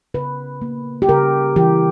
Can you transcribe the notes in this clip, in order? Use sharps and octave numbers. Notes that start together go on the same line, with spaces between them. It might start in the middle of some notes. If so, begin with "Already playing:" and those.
C#3 B4
A#3
G4
C#3 A#4
E3 G4